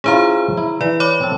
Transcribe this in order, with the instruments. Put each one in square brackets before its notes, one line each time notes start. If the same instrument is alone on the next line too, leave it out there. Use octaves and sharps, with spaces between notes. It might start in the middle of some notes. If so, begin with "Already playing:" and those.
[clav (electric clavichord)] C#4 E4 F4 [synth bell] G#4 C5 A#5
[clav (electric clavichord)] E4
[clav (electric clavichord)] E3 [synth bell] D5
[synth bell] C#5 B5 D6
[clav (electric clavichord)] C4 A4